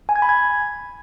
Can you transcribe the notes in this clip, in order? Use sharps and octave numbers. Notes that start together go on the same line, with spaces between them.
G#5
G#6
B5
G#6